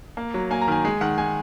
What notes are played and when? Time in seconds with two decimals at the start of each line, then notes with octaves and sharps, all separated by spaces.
0.17 A#3
0.34 F#3
0.51 A#3 G#5
0.62 A#5
0.68 D#3 G#5
0.85 G#3 G#5
1.01 D#3 F#5
1.18 G#3 G#5